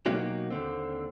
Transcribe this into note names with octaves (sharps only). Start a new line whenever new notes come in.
B2 F#3 A#3 D#4 F#4 G4
D#2 D3 C4